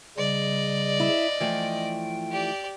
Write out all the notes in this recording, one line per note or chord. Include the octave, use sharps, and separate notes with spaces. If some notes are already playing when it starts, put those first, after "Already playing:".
C#3 G3 D5 D#5
E4
E3 F3 A3 G5
G4 D5